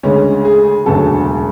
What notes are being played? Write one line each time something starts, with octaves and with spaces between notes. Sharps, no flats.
D2 C#3 G#3 C#4
G#4
E1 D2 C#3 F#3 A4